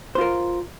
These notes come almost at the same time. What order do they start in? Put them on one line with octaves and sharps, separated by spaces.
C5 F4 A#4